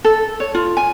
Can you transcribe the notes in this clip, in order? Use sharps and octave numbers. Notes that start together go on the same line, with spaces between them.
A4
C#5
F4
G#5